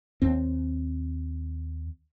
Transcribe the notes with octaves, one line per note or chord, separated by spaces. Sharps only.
D#2 C4